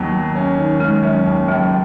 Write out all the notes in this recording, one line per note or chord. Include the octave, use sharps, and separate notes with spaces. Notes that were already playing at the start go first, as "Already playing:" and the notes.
Already playing: D#2 F#3 B3
F#3
C#4
D#3
D#3 G#3
F#3 C#4
D#2
C#2 F#3